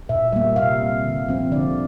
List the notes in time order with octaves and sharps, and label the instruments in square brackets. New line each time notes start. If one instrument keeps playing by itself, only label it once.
[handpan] A#2 E5
G3 A#3 E5
C3 F5
G3 C4
D3
F3 C4
D3 D5